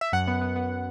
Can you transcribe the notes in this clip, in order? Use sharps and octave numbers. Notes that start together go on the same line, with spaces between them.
E5
F#2 F#5
B3
B3
B3